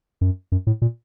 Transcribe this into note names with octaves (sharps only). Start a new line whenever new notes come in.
F#2
F#2
A2
A#2